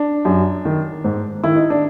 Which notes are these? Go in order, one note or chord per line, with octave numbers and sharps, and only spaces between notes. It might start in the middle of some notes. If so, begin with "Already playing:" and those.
Already playing: D4
F#2
D#3
G#2
D#3 E4
D#4
D4